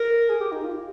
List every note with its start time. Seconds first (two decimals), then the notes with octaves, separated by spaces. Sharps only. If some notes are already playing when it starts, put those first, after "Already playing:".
Already playing: A#4
0.29 G#4
0.40 G4
0.52 D#4
0.62 F4
0.71 G4